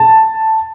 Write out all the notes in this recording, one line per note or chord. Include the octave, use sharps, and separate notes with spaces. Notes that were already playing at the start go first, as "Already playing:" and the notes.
Already playing: A5